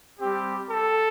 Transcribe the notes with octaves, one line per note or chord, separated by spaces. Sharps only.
G3 C4 G4
A4